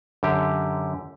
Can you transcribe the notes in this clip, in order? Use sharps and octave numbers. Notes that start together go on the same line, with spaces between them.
F#2 D3 G4